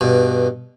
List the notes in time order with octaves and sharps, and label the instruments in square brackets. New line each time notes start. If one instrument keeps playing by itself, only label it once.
[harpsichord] G2 B2